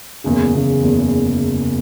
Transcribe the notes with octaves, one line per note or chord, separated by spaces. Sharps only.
F#1 E2 C#3
F#1 E2 C#3
F#1 E2 C#3